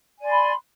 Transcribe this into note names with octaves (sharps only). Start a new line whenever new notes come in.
D5 G#5 B5 C6